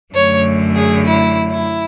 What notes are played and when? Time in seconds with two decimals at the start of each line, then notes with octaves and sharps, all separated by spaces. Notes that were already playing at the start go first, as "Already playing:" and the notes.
0.14 F#2 D3 A3 C#5
0.74 G#4
1.05 E4
1.50 E4